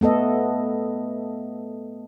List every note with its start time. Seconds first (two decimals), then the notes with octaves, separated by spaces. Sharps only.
0.01 A3 B3 A4 D#5